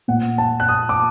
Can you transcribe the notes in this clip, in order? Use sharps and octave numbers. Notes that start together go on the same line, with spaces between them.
A#2 F#5
A5
F#6
D#6
D6